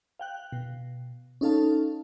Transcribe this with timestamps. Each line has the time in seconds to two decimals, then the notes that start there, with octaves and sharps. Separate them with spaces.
0.19 F5 G5 F#6
0.52 B2
1.41 C#4 D#4 A4 F5 A5